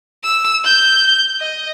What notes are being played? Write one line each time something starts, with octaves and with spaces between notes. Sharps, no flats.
E6
G6
D#5